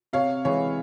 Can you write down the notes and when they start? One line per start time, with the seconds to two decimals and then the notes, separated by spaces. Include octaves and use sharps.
0.13 C3 C#5 F5
0.45 E3 G#3 C#5